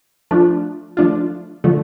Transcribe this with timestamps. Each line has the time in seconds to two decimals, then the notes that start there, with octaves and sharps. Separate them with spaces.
0.31 F3 A3 D4 F4
0.97 F3 A3 D4 F4
1.64 D3 F3 A3